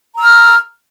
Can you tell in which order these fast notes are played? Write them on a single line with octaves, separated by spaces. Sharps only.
A#5 E6 F6